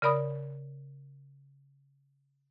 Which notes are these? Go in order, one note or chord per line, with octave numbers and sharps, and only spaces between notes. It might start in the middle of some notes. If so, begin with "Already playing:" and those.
C#3 A#4 D5 B5 D#6